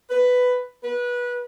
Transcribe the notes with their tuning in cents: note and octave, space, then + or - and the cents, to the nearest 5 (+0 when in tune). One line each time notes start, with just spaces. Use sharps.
B4 +10
B4 -20